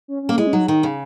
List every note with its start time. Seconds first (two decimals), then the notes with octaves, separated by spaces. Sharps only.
0.08 C#4
0.23 C#4
0.29 A#3
0.38 G#3 E4
0.47 C#4
0.53 F#3 D#4
0.68 D#3 D#4
0.83 C#3